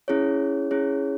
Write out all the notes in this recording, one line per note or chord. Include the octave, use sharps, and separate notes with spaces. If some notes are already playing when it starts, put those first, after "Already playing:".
C#4 E4 G#4 C#5
C#4 E4 G#4 C#5